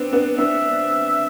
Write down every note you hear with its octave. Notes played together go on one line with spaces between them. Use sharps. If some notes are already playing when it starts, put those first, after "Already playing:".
Already playing: B3 C4 D4
B3 D4
B3 D4 E5